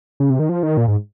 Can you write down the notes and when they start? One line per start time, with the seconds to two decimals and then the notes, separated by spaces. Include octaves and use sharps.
0.20 C#3
0.30 C3
0.39 D#3
0.49 F3
0.63 D#3
0.77 A#2
0.88 G#2